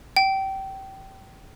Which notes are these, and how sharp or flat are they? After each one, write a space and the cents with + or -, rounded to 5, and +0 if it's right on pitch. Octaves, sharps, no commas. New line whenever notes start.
G5 -25